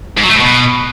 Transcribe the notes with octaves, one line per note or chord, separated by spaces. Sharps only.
G#2
F#3
A3
A2
B2